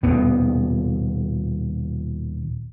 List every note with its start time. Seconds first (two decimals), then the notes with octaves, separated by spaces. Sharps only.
0.03 D#1 D#2 B2 B3